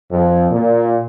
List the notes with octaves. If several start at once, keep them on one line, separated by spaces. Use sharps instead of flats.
F2
A#2